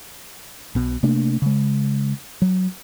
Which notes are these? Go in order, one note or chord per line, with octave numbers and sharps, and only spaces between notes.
B1 B2
C3 A3 A#3 D4
C#3 G#3
F#3